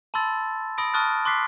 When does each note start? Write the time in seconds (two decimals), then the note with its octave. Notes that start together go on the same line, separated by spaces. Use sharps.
0.14 A5 B5 C6 E6 A6
0.78 B5 D#6 A#6 D7
0.94 A5 C#6 D#6 F6 F#6 A6
1.25 C6 D6 F#6 B6 C7